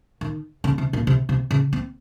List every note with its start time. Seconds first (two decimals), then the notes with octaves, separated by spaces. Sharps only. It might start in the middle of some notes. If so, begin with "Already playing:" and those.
0.21 D#3
0.64 C#3
0.78 C3
0.93 A#2
1.07 C3
1.29 C3
1.51 C#3
1.73 C4